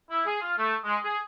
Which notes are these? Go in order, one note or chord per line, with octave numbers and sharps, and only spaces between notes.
E4
G#4
F4
A3
G#3
G#4